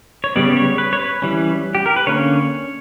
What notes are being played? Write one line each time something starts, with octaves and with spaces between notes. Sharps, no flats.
C#5
C#3 G3 B3 D5
C#5
B4
C#5
B4
E3 G3 C#4
G4
A#4
B4
D3 A#3 C#4 C#5